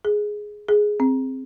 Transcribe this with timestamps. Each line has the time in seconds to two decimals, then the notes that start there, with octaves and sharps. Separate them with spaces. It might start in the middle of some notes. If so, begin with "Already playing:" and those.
0.05 G#4
0.68 G#4
1.00 C4